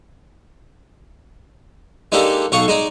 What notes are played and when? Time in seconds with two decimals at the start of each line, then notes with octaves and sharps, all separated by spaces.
2.12 G#3 A#3 D4 D#4 G4 A4
2.52 B1 A4 F5 C#6 D#6
2.68 G#3 D#4 D5